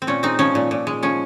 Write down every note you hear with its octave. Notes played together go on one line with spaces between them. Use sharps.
C4
A#2 C#4
G#3 C4 D#4
F3 C#4
A#2
A#2
G#3
F3 C#4